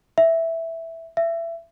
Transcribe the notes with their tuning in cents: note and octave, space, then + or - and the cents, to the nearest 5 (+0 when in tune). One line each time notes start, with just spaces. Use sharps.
E5 +0
E5 +25